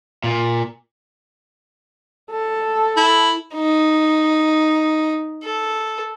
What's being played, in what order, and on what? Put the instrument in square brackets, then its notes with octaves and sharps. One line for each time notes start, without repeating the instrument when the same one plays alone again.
[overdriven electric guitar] A#2
[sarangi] A4
[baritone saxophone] E4
[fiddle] D#4
A4